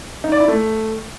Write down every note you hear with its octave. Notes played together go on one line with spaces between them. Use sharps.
D#4
D5
E4
A3